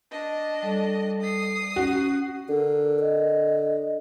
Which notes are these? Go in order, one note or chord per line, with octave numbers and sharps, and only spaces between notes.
D4 D#5
G3 A4 D5
D#6 C7
C#4 F#4
D3 A#4
D#5